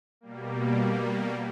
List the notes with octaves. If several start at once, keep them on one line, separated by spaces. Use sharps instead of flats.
B2 G3 A#3